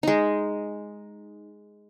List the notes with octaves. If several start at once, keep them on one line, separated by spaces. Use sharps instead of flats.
G#3 D#4